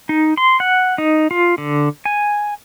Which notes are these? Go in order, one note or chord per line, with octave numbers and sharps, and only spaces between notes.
D#4
C6
F#5
D#4
F4
D3
G#5